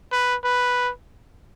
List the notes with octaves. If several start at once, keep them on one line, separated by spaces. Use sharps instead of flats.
B4
B4